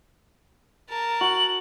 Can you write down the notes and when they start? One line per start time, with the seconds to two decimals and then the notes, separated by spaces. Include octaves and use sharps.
0.89 A#4 A5
1.21 F#4 F#7